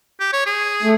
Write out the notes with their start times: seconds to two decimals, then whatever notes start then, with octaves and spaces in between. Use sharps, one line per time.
0.20 G4
0.33 C#5
0.46 G#4
0.83 A3